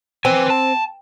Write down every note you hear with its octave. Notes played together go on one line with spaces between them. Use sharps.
C4 B4 G#5
A5